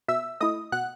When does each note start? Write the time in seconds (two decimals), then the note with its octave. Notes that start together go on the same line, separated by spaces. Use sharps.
0.08 B2 E5 E6
0.40 A3 E4 D#5 D#6
0.72 B2 F#5 F#6